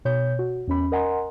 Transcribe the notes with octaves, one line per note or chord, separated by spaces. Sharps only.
B2 C#5 G6
F#4
E2 C#4 B5
A#4 D#5 F#5 G#5 A#5 C6